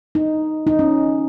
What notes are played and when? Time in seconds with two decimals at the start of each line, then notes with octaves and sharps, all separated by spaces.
0.15 D#4
0.67 D#4
0.79 C#4